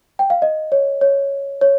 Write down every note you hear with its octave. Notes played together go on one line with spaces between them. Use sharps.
G5
F5
D#5
C#5
C#5
C#5